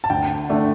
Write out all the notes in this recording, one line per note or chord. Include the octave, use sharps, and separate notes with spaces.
A5
D2 G5
D3 A3 D4